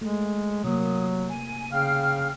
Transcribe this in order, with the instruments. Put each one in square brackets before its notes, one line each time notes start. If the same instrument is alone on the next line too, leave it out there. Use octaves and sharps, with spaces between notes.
[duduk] G#3 [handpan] A3
[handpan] C3 A#3 [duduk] F#3 [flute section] D#6
[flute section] G#5
[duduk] C#3 [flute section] F5 G5 F6